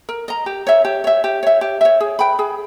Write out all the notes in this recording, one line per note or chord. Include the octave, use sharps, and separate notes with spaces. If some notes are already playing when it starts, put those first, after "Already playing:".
A#4
D#5 A#5
G4
C#5 E5
G4
C#5 E5
G4
C#5 E5
G4
C#5 E5
G#4
B4 G5 B5
G#4